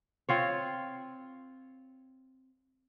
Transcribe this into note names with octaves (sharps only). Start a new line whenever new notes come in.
C4 F4 C#5